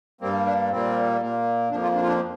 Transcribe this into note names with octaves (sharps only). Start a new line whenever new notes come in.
G2 G3 A#3 C4
D4
A#2 G3 A#3 C4
A#2 A#3
F2 F3 A#3 D4
F4
D4
F4
D4